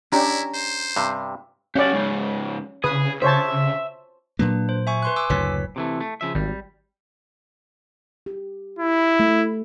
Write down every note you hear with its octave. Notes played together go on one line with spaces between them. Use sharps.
C#4 D4 E4 G4 A#5
C5
G2 C3
C#4 G4 D5 F#5
G#2 C#3
C#3 G#4 B4 D#6
C5 C#5 E5 A5
A#2 F#3 A#3 D4 B4
C5
E5 G#5 C#6
B4 C6 F#6
G#5 D6 E6
F#1 D2 A2 B4 C#5 B6
C3 E3 A3
A3
C#3 F3 E5
G#1 G3
G4
E4
A3